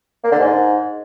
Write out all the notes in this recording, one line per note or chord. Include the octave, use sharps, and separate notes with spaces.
A#3
D3
G#2